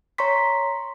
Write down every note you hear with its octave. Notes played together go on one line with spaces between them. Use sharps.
C#5 A#5 C6 C#6 B6